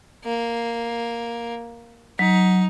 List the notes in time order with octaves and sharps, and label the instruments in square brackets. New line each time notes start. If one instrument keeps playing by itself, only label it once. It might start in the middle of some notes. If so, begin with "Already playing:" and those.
[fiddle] A#3
[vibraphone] F#3 [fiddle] D#4